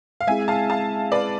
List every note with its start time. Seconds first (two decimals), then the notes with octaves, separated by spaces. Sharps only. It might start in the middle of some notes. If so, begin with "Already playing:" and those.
0.21 F5
0.27 G#3 C4 E4 G#4 E5 G#5
0.48 F5 A5
0.70 F5 A5
1.12 B4 D5